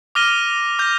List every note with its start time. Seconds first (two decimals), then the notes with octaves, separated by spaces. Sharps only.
0.15 D6 F6 A#6 D#7 G7
0.79 D6 G6 A#6